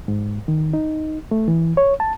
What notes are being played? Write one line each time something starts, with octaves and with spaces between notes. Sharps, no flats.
G#2
D#3
D#4
A3
E3
C#5
A5